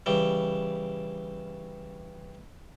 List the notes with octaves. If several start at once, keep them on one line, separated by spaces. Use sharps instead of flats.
C#3 E3 G3